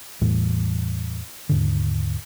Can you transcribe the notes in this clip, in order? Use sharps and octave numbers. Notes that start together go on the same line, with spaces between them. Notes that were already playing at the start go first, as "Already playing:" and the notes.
E2 A2 E3 G3
D#2 G#2 D3